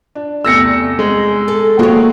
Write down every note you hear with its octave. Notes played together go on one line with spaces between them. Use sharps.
D4
E2 C3 A3 E6 A#6 C#7
G#3
A4
A3 A#3 C4 F#4 G#4 C#5